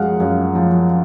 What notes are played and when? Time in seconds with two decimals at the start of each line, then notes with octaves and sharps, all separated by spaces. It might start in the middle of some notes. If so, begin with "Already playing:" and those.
Already playing: F#2 F3 G#3 F5 F#5
0.20 F#2
0.55 F3